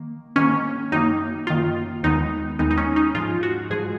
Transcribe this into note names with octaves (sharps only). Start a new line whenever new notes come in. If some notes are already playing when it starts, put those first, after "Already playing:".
Already playing: D#3 A#3
G#2 D#3 A#3 C#4
F#2 D#3 A#3 D#4
F#2 D#3 A#3 F4
D#2 D#3 G#3 B3 D#4
D#2 D#3 G#3 B3 D#4
D#4
C#4
D#4
G#2 F3 G#3 F4
F#4
G#2 F3 G#3 G#4